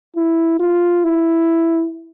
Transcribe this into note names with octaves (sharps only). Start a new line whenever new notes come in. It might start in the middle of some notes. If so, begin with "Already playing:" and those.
E4
F4
E4